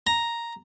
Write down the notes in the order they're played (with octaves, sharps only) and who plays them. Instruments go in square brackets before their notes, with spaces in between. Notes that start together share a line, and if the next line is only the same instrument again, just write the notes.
[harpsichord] A#5